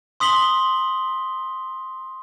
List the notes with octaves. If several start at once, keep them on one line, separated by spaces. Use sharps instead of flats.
C6 D#6 B6 F#7 G7